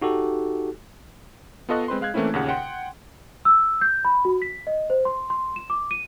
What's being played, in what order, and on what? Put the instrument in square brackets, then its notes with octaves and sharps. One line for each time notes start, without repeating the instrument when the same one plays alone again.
[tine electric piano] D#4 F#4 G4 A4
[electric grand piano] B3 F4 A4 D#5 C#6 F#6
G#3 C4 B4 C6
G#3 F5 F#6 G#6
E3 A3 A#3 C4 C#4 E4
D#2 A#2 C#3 F#5
F#5 G5 C6
[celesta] E6
G6
B5
F#4
B6
D#5
C5
C6
C6
E7
D6
D#7